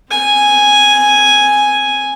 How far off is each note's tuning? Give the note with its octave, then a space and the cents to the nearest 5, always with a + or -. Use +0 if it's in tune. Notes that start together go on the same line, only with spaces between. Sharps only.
C4 +0 G#5 +0